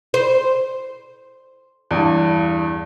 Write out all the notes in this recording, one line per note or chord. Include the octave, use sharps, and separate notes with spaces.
C5
E2 G2